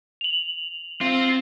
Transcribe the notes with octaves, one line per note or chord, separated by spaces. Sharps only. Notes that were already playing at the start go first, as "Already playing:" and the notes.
F7 F#7
C4 F4